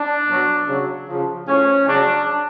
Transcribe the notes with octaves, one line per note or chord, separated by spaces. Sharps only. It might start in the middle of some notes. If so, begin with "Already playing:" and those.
Already playing: D4
B2 F#3
C#3 F#3
C#3 F3
A2 F3 C#4
C#3 F#3 D4